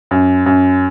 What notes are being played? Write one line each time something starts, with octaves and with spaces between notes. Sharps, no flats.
F#2
F#2